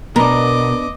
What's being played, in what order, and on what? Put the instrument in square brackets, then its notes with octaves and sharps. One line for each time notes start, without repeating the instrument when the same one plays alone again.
[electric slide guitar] B2 [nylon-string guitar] B3 D4 [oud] A#4 [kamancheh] D#5 D6